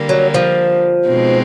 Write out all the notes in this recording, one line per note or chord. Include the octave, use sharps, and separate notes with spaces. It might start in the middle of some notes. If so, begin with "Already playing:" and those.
Already playing: D3 G3 A#3
F#3
F3
B2 G#3 C4 D#4